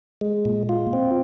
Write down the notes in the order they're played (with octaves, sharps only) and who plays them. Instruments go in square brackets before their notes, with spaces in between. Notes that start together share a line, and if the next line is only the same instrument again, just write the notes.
[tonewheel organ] G#3
A#2
F4
C4